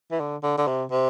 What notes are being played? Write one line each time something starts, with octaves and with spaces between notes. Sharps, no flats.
E3
D3
D3
D3
C3
C3